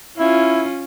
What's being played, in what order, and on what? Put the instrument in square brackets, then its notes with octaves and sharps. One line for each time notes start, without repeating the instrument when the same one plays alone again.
[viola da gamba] C#4 F4 [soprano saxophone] E4